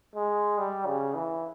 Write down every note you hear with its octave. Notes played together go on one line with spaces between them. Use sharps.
G#3
G3
C#3
E3